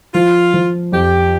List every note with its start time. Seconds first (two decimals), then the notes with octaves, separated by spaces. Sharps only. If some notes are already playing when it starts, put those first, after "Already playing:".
0.14 F3 F4
0.54 F3
0.92 F2 G4